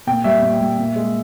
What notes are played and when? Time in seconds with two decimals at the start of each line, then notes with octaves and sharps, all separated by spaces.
0.07 A#2 G5
0.24 G3 E5
0.42 A#2
0.60 G3
0.78 A#2
0.96 G#3